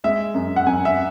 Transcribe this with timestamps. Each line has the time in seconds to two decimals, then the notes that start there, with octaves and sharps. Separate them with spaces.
0.04 G#3 E5
0.34 F#2
0.56 F#5
0.66 F#2 G#5
0.85 E5